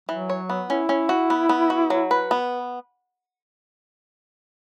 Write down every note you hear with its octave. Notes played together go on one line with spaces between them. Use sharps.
E3 F#3
C#5
B3
C#4 E4
C#4
F#4
B3
B3
F#4
F#3
B4
B3